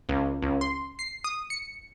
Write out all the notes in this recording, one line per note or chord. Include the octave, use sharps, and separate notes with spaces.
C#2
C#2
C6
C7
D#6
C#7